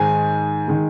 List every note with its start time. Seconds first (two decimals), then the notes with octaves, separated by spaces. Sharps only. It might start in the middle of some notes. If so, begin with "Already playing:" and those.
Already playing: G#2 D#3 G#3 G#5
0.68 D#3 G#3